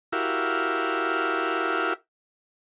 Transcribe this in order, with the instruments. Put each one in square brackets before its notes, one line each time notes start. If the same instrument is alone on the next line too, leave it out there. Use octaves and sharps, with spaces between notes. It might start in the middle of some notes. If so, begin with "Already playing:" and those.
[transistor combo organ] E4 F#4 G4 A#4 E5 F5